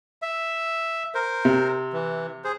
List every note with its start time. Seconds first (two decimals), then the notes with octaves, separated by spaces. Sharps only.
0.22 E5
1.15 A#4 C5
1.45 C3
1.93 E3
2.44 G#4 C5